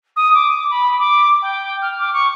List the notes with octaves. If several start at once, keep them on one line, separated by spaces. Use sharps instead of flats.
D#6
D6
B5
D6
G5
F6
D6
C#6